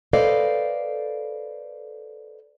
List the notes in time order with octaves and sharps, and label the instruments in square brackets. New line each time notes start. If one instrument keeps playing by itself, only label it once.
[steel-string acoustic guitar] A4 B4 C5 D5 D#5 F5